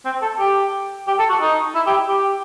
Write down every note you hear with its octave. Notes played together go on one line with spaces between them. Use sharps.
C4
A4
G4
G4
A4
F#4
D#4
E4
G4
G4